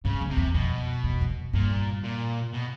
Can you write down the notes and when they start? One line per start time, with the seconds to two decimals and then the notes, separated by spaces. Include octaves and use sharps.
0.05 G#2 C#3
0.21 F#2
0.30 C3
0.37 E2
0.54 F2 B2
1.04 E2
1.21 F2
1.53 G2 A#2
2.04 A#2
2.54 B2